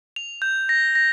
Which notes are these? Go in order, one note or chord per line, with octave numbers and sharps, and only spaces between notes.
F7
G6
A#6
A#6